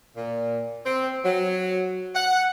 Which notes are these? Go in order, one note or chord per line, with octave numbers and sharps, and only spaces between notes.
A#2
C4
F#3
F#5